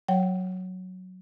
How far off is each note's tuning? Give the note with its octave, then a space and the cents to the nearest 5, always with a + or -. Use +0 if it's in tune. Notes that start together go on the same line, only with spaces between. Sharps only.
F#3 +0 C#5 +0 G5 -25